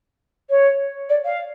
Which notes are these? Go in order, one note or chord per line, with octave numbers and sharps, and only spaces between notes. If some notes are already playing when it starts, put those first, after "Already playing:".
C#5
D5
F5